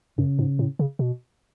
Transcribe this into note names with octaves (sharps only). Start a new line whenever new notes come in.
F#2 C#3
G#2
A2
C#3
B2